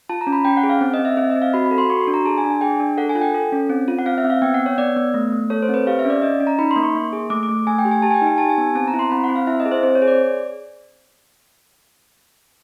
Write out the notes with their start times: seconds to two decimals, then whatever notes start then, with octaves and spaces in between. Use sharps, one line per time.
0.09 F4 A5
0.21 A#5
0.27 C#4
0.33 B5
0.45 C#4 G5
0.57 F#5
0.63 G#4
0.70 F5
0.81 C4
0.94 D#5
0.99 C4
1.05 E5
1.17 C4 E5
1.30 D#5
1.36 C4
1.42 F5
1.54 F#4 B5
1.66 B5
1.71 A4
1.78 C6
1.90 F#4 C#6
2.01 C6
2.07 D4
2.14 A#5
2.25 G#4 A5
2.38 G#5
2.44 D4
2.50 G#5
2.61 G#4 G5
2.80 D4
2.98 A4 F#5
3.09 G#5
3.15 F4
3.21 G5
3.34 A4
3.52 C#4
3.70 C4
3.88 F4
3.99 F#5
4.06 C4 F5
4.18 E5
4.24 C4
4.30 F5
4.42 B3 G5
4.54 F#5
4.60 B3
4.66 C#5
4.78 B3 D5
4.96 B3
5.14 A3
5.32 A3
5.50 A4 C#5
5.62 C5
5.69 C4
5.74 B4
5.87 G4 F5
5.99 E5
6.05 C#4
6.10 D5
6.22 C#4 D#5
6.41 C#4
6.47 A#5
6.59 D#4 B5
6.71 C6
6.76 A#3
6.83 C#6
6.95 A#3
7.13 G#4
7.30 A3 D6
7.43 D6
7.49 A3
7.67 A3 G#5
7.79 G5
7.85 G4
7.91 G#5
8.02 G4 A5
8.11 G#5
8.14 G5
8.22 D#4
8.27 G#5
8.38 G4 A5
8.49 G#5
8.58 B3
8.75 C4 A5
8.87 A#5
8.94 E4
8.99 C6
9.11 C4 B5
9.24 F#5
9.29 C4
9.36 F5
9.47 E4 E5
9.60 D#5
9.65 G#4
9.71 C5
9.83 C4 C5
9.95 C#5
10.02 G#4
10.07 D5